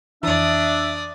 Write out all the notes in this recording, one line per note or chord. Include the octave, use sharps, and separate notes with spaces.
F2 E3 D4 D5 E5 D#6